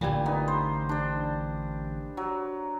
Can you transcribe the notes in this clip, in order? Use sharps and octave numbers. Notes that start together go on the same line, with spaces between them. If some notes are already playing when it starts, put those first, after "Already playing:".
A1 A#2 D3 E3 G3 G#5
B3 D#4
C5
D4 C5
F#3